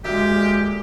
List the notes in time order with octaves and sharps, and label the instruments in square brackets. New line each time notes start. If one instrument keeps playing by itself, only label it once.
[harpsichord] D2 A#2 [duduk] G#3 [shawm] G4